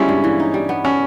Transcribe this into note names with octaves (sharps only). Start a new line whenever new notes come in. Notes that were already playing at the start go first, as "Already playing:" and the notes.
Already playing: G3 G#3 B3 C#4 E4 F4
G2
E3
D#4
G3
B3
C#4 D4